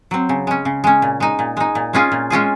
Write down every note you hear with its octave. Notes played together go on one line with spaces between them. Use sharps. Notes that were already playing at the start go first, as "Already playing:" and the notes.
F#3 C4
C#3
G#3 C#4
C#3
G#3 C#4
A#2
G#3 D#4
A#2
G#3 D#4
A#2
G#3 C#4 F4 G#4
A#2
G#3 C#4 F4 G#4